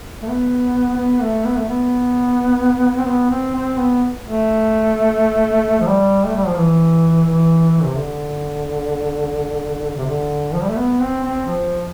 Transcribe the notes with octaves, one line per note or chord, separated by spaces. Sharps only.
A3
B3
B3
A3
B3
A3
B3
C4
B3
C4
C4
B3
A3
F3
G3
A3
G3
F3
E3
E3
C3
D3
C3
D3
F3
G3
A3
B3
C4
C4
F3